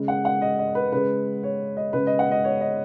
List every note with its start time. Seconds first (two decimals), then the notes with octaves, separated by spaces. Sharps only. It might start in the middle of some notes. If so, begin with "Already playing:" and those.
Already playing: C#3 G#3
0.08 F#5
0.25 F#5
0.42 D#5
0.59 D#5
0.75 B4
0.92 C#3 G#3 B4
1.43 C#5
1.77 D#5
1.93 C#3 G#3 B4
2.07 D#5
2.19 F#5
2.31 D#5
2.44 C#5
2.61 D#5